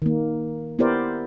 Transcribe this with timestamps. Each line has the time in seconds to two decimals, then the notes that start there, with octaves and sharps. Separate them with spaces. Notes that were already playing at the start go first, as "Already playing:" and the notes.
0.02 D#3 A#3
0.79 B3 E4 G4 A#4 C5 D5